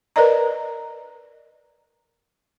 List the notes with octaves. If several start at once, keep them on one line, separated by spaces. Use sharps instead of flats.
A#4 B4 D5 D#5 A#5